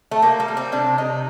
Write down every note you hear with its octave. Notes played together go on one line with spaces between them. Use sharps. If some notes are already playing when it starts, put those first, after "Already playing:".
A3
G3 A#3
A#3
G3
C4
C3 D4
C3 D#4